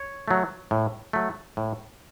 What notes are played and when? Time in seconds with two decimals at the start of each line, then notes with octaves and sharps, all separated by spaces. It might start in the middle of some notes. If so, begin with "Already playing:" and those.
Already playing: C#5
0.28 F#3 A3
0.71 A2
1.13 F#3 A3
1.57 A2